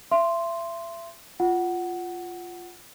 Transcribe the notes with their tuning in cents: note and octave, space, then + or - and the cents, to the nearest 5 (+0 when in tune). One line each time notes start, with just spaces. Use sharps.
E5 +35 C6 +0
F4 +0 F#5 +10